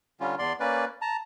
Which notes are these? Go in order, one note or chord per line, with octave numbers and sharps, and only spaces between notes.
D3 G3 C#4 F4
E2 D5 C6
A#3 C#4 B4 D5
A5 A#5